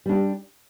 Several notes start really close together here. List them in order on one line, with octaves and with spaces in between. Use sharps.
G3 D4 G4